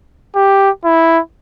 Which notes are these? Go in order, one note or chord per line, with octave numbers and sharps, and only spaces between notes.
G4
E4